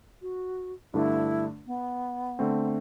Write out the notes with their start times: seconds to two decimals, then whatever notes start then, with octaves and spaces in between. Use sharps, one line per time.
0.22 F#4
0.94 G2 D3 A3 D4 E4
1.67 B3
2.39 D3 A3 C4